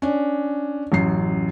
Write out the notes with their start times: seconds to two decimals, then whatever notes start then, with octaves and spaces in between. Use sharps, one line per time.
0.02 C#4 D4
0.92 A1 F#2 C7